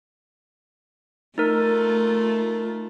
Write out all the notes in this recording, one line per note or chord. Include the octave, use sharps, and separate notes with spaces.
A3 D#4 F4 A#4